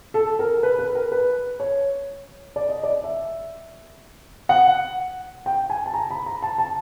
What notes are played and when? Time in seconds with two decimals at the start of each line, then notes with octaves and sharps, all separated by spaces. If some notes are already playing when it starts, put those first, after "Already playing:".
0.14 A4
0.39 A#4
0.63 B4
0.79 B4
0.95 A#4
1.12 B4
1.60 C#5
2.56 D5
2.69 D#5
2.83 D5
3.04 E5
4.49 F#5
5.46 G5
5.70 G#5
5.86 A5
5.94 A#5
6.10 B5
6.26 A#5
6.42 A5
6.58 A5